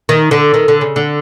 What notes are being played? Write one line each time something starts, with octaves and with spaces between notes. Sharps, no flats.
D#3
D3
D#3
D3
C#3
D3